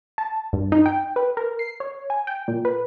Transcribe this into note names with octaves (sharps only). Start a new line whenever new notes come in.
A5
G2
D#4
G5
B4
A#4
C7
C#5
G#5
G5
A#2
B4